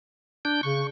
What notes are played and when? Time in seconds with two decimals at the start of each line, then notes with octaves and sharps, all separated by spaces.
0.45 D4 G6
0.63 C#3 C#6